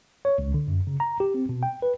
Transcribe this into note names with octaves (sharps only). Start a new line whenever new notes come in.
C#5
C#2
D3
F#2
C#3
A#5
G4
C4
B2
G5
B4